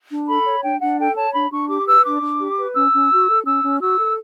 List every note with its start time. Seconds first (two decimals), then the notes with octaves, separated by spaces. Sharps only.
0.11 D4
0.28 A4 B5
0.46 C#5
0.63 D4 G5
0.81 D4 F#5
0.98 A4 G5
1.16 C#5 A5
1.33 D4 B5
1.51 D4 C#6
1.69 G4 D6
1.87 B4 E6
2.04 D4 D6
2.21 D4
2.40 G4
2.57 B4
2.74 C#4 E6
2.93 C#4
3.10 F#4
3.28 A4
3.45 C#4 E6
3.62 C#4
3.80 F#4 E6
3.98 A4